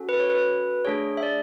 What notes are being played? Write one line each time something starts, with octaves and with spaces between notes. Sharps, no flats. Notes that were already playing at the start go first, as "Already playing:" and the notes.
Already playing: C#4 F#4 A4
B4
C#5
B4
A3 D4 G#4 C#5
E5
D5